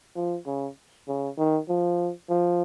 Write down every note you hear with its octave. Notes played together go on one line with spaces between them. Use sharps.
F3
C#3
C#3
D#3
F3
F3